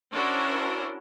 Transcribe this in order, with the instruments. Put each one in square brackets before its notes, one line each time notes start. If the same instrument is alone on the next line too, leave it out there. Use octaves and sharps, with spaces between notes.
[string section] C#4 D4 E4 F#4 A#4 C5